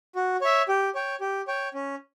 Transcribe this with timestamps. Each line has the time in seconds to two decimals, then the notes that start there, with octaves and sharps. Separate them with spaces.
0.15 F#4
0.41 C#5 E5
0.69 G4
0.95 C#5 G5
1.20 G4
1.48 C#5 G5
1.74 C#4